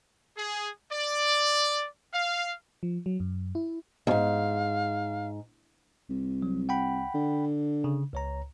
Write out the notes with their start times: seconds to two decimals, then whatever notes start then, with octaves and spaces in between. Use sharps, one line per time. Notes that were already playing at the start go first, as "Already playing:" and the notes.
0.35 G#4
0.90 D5
2.12 F5
2.83 F3
3.06 F#3
3.20 F#2
3.55 E4
4.07 D#2 G#2 F5
6.10 C2
6.42 F#3
6.69 F#5 G5 B5
7.14 D3
7.84 C#3
8.13 C#2 C#5 A#5